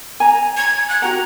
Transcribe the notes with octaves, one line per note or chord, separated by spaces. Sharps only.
G#5 A#5
G#6
F#6
F#4 G4 F#5 A#5